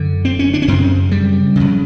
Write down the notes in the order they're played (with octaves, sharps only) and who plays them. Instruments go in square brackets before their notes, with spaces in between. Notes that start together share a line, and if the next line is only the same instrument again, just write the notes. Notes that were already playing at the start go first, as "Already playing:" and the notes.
Already playing: [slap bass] F#2 D3
C4
C#4
D4
C#4
F#2 C#3 C4
G3
F2 C#3